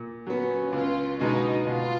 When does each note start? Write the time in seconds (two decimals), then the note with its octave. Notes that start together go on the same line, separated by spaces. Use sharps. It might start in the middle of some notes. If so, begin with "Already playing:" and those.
Already playing: A#2
0.26 F#3 B3 C#4
0.72 C#2 F4
1.19 B2 G#3 B3 D#4 F#4
1.66 B2 F4